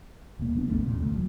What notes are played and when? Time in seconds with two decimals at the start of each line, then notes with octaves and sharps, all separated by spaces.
0.39 D#1 C3 A#3
0.55 F3 B3 D4
0.68 A1 E2 C#3 A3
0.85 D#2 A#2 C#3 A#3
1.00 D2 A3
1.12 D#1 E2 F#3